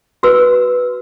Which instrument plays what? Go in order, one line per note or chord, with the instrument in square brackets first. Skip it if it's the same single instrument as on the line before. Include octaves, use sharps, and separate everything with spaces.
[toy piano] F#4 B4 E6